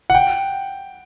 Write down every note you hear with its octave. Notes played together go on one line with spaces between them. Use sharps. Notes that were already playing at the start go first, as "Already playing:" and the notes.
F#5
G5